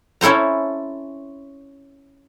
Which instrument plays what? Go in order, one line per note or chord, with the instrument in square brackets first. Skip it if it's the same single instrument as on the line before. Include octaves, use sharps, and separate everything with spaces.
[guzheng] C#4 E4 A4 C5 A#5